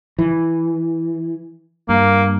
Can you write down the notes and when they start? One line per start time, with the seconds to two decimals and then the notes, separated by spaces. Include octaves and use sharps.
0.19 E3
1.89 G2 A#3